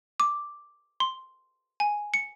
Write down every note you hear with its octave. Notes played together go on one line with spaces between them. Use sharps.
D6
C6
G#5
C#7